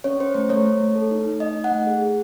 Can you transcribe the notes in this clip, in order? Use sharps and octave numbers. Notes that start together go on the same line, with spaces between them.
C#4 C#5
C#4 C5
A3 C5
A3 C#5
A3
A3
A4
D#4
A3
D#4 D#5
D#4
F#5
A3
G#4
G#4